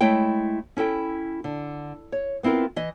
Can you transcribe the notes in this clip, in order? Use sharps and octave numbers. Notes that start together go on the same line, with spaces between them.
G#3 A3 E4 C#5 G5
C#4 E4 A4 G5
D3
C#5
B3 C4 E4 F4 A#4
E3 D#5